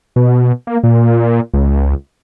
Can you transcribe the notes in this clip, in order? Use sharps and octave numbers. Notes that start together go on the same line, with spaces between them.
B2
A#3
A#2
C#2